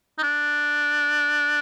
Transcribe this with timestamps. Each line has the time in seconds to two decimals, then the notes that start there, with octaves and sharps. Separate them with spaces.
0.18 D#4
0.23 D4